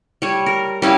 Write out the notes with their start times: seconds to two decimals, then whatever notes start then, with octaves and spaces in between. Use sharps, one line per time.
0.22 G3 C#5
0.46 A#4
0.82 G3 C#4 E4 F5